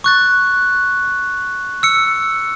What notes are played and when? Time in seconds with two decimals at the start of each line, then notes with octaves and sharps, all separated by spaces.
0.04 C#6 F#6 A6
1.83 E6 C#7